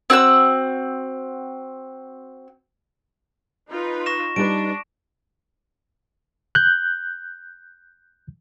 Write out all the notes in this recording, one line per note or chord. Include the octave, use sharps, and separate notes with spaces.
C4 F#4 F#5 E6
D#4 F4 B4
C#6 A#6 E7
G3 D4 D#4 B4 D7
F#6 G6